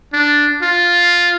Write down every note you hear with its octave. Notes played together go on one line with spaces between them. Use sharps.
D4
F4